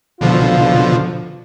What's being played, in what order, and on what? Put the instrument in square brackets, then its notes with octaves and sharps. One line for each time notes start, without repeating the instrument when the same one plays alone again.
[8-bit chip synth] B2 D3 F3 [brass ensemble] F4